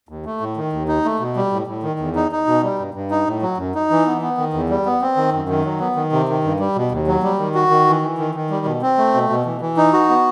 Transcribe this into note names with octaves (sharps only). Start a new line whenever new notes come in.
D#2
A3
A2
D#3
D#2
D#4
A3
B2
G3
A2
A2
D#3
E2
D#4
D#4
B2
G3
G2
G2
D#4
A2
F#3
F#2
D#4
E3
B3
B3
D#3
E2
G3
B3
C4
D#3
F#2
D#3
F#3
B3
D#3
C3
D#3
G2
G3
B2
D#2
F#3
G3
D#3
F#4
D#3
E3
E3
D#3
D#3
G3
B2
C4
A3
B2
B2
E3
E3
D#4
F#4
B3